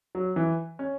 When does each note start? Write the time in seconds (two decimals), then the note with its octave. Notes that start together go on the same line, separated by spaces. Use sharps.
0.15 F#3
0.36 E3
0.79 C#4